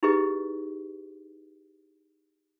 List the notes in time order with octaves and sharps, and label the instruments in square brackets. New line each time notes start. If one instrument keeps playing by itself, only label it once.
[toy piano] D#4 E4 G4 G#4 B4 D#5